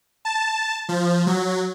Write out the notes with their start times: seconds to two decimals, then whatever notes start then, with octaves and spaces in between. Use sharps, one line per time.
0.25 A5
0.89 F3
1.27 F#3